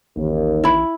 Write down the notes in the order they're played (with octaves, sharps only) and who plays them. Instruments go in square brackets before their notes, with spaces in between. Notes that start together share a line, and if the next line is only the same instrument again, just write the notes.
[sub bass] A1 [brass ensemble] D#2
[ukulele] E4 B5